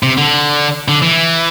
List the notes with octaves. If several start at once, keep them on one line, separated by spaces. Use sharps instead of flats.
C3
D3
D3
E3